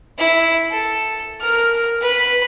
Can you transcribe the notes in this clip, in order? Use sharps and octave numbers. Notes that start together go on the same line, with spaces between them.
E4
A4
A#4 F6
B4 B5